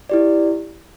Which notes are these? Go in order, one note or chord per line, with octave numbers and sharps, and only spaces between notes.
E4 G4 D5